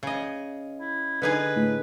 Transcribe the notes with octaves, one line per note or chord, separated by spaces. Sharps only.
C#3 D#5
E4
D3 D#4 G#4 B4
A2